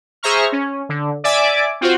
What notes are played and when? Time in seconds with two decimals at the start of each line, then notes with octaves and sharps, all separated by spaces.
0.23 G#4 C5 E5 A#5 C#6 F6
0.52 C#4
0.89 D3
1.24 D5 E5 G#5 D6
1.81 C4 F4 F#4 C5